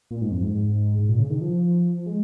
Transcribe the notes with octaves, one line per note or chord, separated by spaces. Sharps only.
A#2
G#2
F2
G#2
G#2
A#2
C#3
D#3
F3
G#3